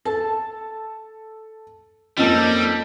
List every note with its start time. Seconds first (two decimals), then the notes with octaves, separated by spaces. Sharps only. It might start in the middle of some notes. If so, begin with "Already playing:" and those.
0.05 A4 A5
2.18 F2 G3 A#3 C#4 D#4 A4